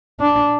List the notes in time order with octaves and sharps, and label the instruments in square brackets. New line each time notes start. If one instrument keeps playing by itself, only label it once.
[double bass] D4